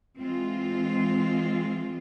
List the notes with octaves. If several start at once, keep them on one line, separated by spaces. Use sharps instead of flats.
E3 G#3 C4 F4